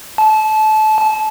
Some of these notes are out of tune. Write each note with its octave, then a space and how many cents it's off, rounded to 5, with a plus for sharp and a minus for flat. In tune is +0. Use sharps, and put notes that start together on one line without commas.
A5 -25